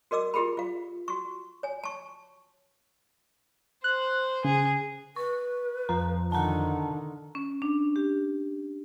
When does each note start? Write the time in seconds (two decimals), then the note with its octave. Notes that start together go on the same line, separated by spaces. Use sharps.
0.11 F#4 A#4 D#5 D6 E6
0.34 E4 F4 G4 G#4 A#4 B5
0.57 F4 F5
1.08 F#4 C#6
1.63 C#5 G#5
1.84 A5 C#6
3.84 C5 F#6
4.45 C#3 G#4
5.16 B4 C#6
5.89 F2 F3 A#5
6.32 D3 D#3 F#5 A5 A#5
7.35 C#4
7.62 D4
7.96 G4